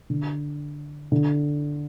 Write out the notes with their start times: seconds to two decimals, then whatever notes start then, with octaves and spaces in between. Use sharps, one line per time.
0.10 D3
1.12 D3